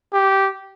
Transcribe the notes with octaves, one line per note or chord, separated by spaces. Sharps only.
G4